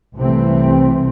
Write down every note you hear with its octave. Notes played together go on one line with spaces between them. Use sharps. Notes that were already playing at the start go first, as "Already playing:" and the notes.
C2 C3 E3 A3 C4